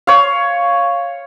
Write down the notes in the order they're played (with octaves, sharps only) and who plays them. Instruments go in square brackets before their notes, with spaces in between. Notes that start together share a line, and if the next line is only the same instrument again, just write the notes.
[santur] C#5 F5